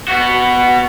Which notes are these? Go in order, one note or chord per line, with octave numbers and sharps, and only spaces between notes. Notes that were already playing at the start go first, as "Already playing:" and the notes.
B3 F#4